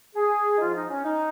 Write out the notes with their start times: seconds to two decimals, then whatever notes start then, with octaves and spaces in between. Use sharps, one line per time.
0.16 G#4
0.56 D#4
0.60 G#2 F3 F4
0.75 D#4
0.90 C#4
1.05 D#4